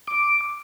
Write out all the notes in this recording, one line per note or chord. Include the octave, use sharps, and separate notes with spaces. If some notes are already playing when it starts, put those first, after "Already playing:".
D6